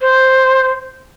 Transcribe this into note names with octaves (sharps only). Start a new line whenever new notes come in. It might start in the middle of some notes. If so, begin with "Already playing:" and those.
C5